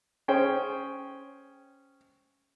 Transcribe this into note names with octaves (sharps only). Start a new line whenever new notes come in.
C#4 G#4 C5 G5